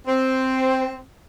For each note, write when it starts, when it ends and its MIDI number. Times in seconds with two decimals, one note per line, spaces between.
0.07 0.99 60